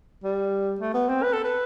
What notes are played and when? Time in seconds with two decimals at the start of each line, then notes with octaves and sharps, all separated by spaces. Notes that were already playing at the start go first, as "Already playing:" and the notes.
0.24 G3
0.81 A3
0.94 B3
1.09 C4
1.23 B4
1.33 A4
1.44 B4